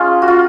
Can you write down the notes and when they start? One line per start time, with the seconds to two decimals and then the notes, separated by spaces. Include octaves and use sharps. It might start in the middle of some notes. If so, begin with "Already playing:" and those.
Already playing: G#3 C#4 D#4 F4
0.22 F#4
0.28 F4